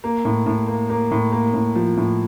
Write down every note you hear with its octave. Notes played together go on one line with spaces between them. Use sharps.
A#3
A2
A2
A#3
A#3
A2
A#3
A2
F3
A2